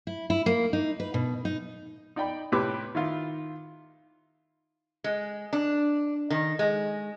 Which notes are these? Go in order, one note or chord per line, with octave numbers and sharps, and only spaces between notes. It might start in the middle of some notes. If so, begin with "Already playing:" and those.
E4
E4
A#3
D#4
B4
B2
D#4
D#4 D5 G5 B5
A2 C3 G4 B4 D6
D#3 E4 F4
G#3
D4
D#3
G#3